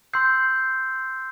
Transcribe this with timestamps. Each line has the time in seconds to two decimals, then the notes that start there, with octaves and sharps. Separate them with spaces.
0.14 C6 E6 G6 C7